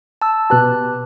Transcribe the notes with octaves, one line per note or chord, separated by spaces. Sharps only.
A5 E6
B2 G4 B4 A5 F#6